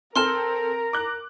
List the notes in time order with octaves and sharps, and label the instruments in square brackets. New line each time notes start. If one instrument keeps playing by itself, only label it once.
[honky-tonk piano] C4 A4 [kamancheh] A#4 [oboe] A#5 [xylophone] C6 F6 E7
[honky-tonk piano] D6 F#6